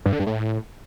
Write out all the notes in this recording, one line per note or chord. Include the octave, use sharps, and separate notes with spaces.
G2
D3
G2
A2